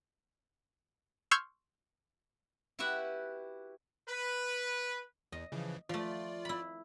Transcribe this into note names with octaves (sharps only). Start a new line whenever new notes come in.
C6 C#6 E6 F6 G6 G#6
E4 F#4 G4 B4 E5 F#5
B4
E2 D#5
C#3 E3 F3
F3 A3 F4 D5
E4 B5